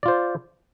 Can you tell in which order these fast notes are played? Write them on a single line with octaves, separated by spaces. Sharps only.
D5 F4 C5